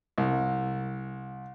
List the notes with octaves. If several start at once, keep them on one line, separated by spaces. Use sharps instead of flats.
C2